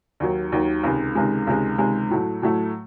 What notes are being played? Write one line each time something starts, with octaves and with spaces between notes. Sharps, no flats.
D#2 D#3 F#3
D#2 D#3 F#3
C#2 C3 D#3 G#3
C#2 C3 D#3 G#3
C#2 C3 D#3 G#3
C#2 C3 D#3 G#3
A2 F#3 A3
A2 F#3 A3